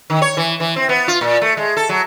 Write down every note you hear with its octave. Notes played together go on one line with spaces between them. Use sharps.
D#3
C#5
E3
E3
C4
B3
F4
A#2
A3
G#3
A4
F#3